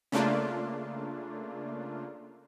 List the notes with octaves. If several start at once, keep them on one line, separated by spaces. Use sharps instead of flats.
C#3 A3 A#3 D4 F4